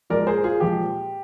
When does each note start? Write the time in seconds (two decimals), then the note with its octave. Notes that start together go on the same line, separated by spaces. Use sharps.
0.10 A#2 F3 G#3 A#4 D5
0.27 G#4 C5
0.44 F4 G#4
0.60 A#2 F3 G#3 G4